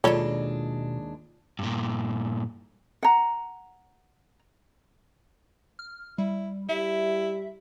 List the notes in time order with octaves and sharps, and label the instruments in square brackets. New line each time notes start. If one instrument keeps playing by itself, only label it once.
[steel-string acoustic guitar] D#2 G#3 D4 [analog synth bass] B2 [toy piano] F4 D5 [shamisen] A4 C#5
[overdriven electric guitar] G2 A#2
[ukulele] F#5 A#5
[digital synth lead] F6
[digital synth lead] G3 [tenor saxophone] E4
[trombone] G3 [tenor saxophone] E4 [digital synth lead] E5